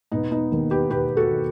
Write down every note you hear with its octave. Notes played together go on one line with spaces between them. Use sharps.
E1 B3 D#4
B3 D#4
D#2 D#3
G4 B4
E1 G4 B4
F#4 A4
D#3